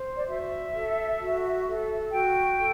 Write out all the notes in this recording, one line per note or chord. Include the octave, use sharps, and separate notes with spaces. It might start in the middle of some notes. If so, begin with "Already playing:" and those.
Already playing: C5
D5
F#4 E5
A4
F#4
A4
F#4 G5
A4